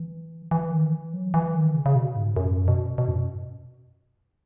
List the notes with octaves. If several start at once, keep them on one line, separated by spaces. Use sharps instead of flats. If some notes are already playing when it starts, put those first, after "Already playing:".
Already playing: E3
E3
D#3
E3
F#3
E3
D#3
C#3
C#3
B2
G#2
F#2
B2
B2
F#2